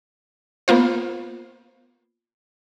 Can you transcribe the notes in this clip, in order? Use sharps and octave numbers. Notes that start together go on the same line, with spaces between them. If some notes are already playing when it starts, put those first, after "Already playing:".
A#3 B3 F4 C5